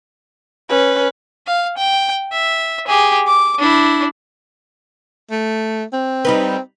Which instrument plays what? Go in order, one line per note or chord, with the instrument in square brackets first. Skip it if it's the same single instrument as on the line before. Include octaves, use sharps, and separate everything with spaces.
[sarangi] C#4 [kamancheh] B4
[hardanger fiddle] F5
G5
E5
G4 G#4
D6
D4 E4
[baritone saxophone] A3
C4
[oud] G3 D#4 B4